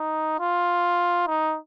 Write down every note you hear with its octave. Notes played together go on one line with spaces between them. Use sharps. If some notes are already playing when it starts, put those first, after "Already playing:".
Already playing: D#4
F4
D#4